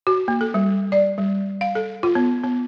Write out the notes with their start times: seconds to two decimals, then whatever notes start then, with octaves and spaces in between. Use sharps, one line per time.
0.07 F#4
0.28 A#3
0.41 A4
0.54 G3
0.92 D5
1.18 G3
1.61 F5
1.75 A4
2.03 F4
2.15 B3
2.44 B3